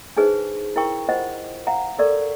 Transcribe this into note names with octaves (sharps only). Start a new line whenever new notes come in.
D4 D#4 G#4 B4 C5
E4 A#4 G5 C#6
F4 C5 D#5 F#5
F5 F#5 A#5
A4 A#4 D5 C#6